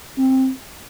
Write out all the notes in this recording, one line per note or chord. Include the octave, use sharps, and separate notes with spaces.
C4